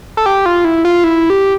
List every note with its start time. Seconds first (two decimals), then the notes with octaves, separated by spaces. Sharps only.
0.17 A4
0.26 G4
0.46 F4
0.65 E4
0.85 F4
1.04 E4
1.30 G4